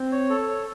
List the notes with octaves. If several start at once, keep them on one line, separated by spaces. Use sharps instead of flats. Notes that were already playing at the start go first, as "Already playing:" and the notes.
Already playing: C4
C#5
A4
C#5